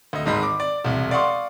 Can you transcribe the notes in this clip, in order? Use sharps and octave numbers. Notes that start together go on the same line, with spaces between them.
D2 D#5
G#1 G#2 D#5 B5
D6
D5
E1 C2
D5 F5 F#5 C6 C#6 D#6